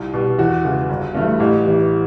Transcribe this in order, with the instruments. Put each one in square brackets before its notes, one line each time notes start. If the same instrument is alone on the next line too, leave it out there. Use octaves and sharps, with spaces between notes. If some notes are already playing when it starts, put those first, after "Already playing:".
Already playing: [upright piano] C2 F4
B2 G3
E2 F#4
C#3 E3 G#3
G1
G2 E3 A3
A1 G4
A2 E3 G3